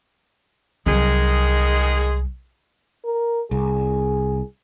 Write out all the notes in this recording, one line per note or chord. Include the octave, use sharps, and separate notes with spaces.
C2 D#3 F#3 G#3 G#4
A#4
C2 G#4